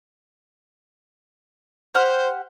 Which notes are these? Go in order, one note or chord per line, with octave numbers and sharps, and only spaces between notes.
G4 C5 F#5 F6